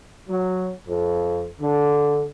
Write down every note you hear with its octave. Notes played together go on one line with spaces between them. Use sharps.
F#3
F2
D3